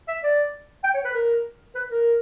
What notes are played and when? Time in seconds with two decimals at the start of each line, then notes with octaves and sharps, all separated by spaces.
0.08 E5
0.23 D5
0.84 G5
0.94 C#5
1.05 B4
1.14 A#4
1.75 B4
1.91 A#4